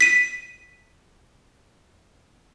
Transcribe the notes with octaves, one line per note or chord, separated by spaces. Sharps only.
B6 D#7